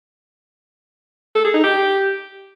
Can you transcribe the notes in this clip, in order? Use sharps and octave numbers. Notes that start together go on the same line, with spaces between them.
A4
G#4
D#4
G4